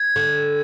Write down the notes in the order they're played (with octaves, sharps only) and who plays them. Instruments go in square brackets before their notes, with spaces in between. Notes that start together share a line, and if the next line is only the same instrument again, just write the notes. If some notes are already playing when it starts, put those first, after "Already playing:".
Already playing: [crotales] G#6
[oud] D3